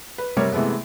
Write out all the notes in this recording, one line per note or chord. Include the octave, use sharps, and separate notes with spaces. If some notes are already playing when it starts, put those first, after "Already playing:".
B4
C3 G3 A#4 C#5
C3 E3 G#3 A3 B3